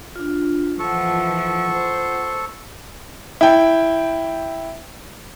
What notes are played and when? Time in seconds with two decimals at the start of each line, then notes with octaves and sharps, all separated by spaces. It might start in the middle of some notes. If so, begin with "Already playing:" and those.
0.16 D4 F4
0.79 E3 F3 F4 A4 F#5 C#6
1.72 C5
3.41 E4 G5